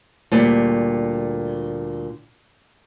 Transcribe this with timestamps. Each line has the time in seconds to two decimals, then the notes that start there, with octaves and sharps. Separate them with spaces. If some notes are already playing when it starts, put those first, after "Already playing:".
0.32 D2 A#2 G3